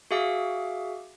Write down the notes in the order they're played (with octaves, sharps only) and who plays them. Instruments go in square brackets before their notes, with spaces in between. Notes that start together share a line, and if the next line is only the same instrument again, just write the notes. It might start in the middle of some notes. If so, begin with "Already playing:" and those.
[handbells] F#4 G#4 E5 F5 D6